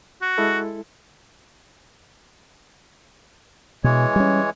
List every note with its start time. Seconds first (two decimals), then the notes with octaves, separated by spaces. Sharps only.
0.22 F#4
0.38 G#3 E4 A4
3.84 B2 E3 G#3 C#5
4.16 G3 C#4